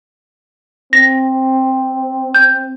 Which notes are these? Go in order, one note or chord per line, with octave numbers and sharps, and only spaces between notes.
C4 A#6
G6